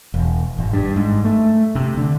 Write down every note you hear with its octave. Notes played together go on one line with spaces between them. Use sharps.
E1
G#1
G2
G#2
A3
C3
D3